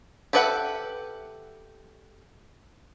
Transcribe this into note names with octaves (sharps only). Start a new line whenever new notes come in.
G4 A4 B4 E5 F#5